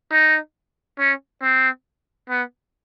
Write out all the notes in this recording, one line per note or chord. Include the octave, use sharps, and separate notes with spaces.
D#4
C#4
C4
B3